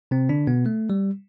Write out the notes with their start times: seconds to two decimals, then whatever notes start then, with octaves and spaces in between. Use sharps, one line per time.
0.11 C3 C4
0.29 D3 D4
0.47 B2 B3
0.66 A3
0.90 G3